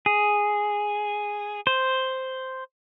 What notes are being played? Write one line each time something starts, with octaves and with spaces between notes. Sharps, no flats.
G#4
C5